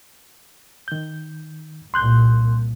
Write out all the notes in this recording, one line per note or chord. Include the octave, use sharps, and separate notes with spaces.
D#3 G6
C2 A#2 C6 F#6 G6